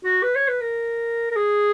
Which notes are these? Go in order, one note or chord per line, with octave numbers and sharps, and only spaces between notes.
F#4
B4
C#5
B4
A#4
A#4
G#4